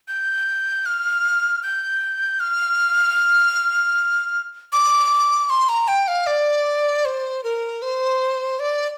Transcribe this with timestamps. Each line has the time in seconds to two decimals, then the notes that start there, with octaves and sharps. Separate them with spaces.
0.08 G6
0.86 F6
1.63 G6
2.40 F6
4.73 D6
5.50 C6
5.69 A#5
5.88 G5
6.08 F5
6.27 D5
7.05 C5
7.44 A#4
7.82 C5
8.59 D5